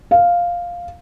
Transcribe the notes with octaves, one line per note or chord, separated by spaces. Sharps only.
F5